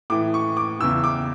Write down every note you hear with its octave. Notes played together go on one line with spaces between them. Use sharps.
A2 E3 D6
C#6
D6
E2 C#3 E3 E6
D6